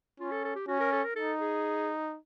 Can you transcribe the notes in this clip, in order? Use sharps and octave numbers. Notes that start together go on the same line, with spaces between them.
C#4 F4
A4
A4
G4
C#4 F#4
A#4
A4
A#4
D#4 A4
G#4